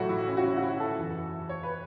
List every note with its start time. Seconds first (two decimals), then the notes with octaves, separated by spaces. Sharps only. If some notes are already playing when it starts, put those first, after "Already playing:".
Already playing: A1 A2 F#3 A3 F#4
0.09 E4
0.27 C#4
0.37 F#4
0.44 E4
0.57 F#4
0.63 E4
0.80 A4
0.97 F#1 E2 E3
1.49 C#5
1.63 B4